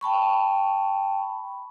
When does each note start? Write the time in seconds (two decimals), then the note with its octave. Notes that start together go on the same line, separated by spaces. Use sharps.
0.01 G5 A5 B5 C#6